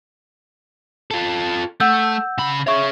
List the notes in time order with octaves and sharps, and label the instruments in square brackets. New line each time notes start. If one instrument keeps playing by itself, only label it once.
[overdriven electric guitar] F4 A4
[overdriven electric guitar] A3 [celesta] F#5 E6 G6
[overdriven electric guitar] C#3 B5
[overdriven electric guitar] G#4 C#5 [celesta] E5 C#6